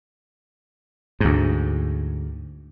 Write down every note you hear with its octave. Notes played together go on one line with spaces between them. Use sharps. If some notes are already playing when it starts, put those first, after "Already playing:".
D2 G#2